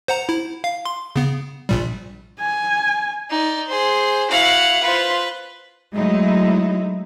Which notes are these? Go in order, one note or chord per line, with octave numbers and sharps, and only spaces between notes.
C5 F#5 A#5
E4
F5
C6
C#3 B3
A#1 A#2 G3
G#5
D#4 D5
G#4 C5
E4 F#4 F5 F#5
F4 B4 C5
F#3 G#3 A3 D#4 E4